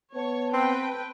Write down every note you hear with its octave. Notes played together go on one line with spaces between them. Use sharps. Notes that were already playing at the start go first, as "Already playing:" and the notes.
B3 C#5 A5
C4 B4 G5